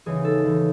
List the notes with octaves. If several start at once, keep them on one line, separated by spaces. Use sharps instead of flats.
D#2 C#3 E3 G#4
A4
D#2 C#3 E3